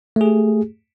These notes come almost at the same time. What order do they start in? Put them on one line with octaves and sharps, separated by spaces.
A3 G#4 G4